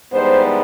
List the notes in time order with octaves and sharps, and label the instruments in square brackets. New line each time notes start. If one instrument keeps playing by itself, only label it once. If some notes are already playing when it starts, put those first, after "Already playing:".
[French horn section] G#2 E3 G3 B3 C5